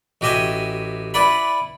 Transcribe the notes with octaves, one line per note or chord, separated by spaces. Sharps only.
A1 F#4 G4 D#5 E5 G#5
E4 B4 D5 F#5 B5